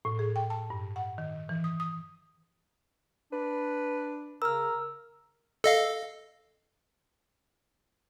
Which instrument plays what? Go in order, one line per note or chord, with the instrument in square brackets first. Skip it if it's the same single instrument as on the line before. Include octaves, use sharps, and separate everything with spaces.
[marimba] A2
G#4
G5
A5
G2
F#5
D#3
E3
D#6
D#6
[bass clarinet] D4 [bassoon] B4
[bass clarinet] C#3 [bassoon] A#4 [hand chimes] E6 F6
[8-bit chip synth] A4 D#5 F5